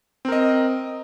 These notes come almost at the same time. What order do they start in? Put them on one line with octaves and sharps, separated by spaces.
C4 A#4 D#5